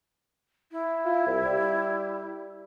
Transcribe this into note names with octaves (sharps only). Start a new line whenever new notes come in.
E4
F4
C2
G3